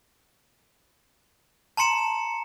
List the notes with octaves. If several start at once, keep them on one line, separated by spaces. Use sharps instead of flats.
A5 A#5 C6 C#7 E7